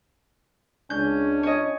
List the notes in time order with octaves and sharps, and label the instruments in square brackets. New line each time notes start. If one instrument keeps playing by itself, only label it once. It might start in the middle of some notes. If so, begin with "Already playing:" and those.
[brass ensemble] C#2 D4 [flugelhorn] C#4 [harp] G6
[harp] C#5 D#5